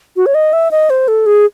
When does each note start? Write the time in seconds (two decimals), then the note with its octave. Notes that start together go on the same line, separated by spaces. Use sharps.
0.16 F#4
0.26 C#5
0.35 D#5
0.53 E5
0.71 D#5
0.90 C5
1.08 A4
1.26 G#4